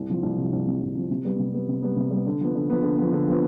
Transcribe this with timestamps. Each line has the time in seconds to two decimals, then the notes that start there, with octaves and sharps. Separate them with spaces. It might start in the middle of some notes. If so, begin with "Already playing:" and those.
Already playing: C2
0.09 C3 F3
0.23 C2
0.38 C3 F3
0.53 C2
0.67 C3 F3
0.82 C2
0.95 C3 F3
1.11 C3
1.25 G3 B3
1.39 C3
1.54 G3 B3
1.68 C3
1.82 G3 B3
1.96 C3
2.11 G3 B3
2.26 D3
2.41 F3 B3
2.55 D3
2.70 F3 B3
2.83 D3
2.98 F3 B3
3.13 D3
3.28 F3 B3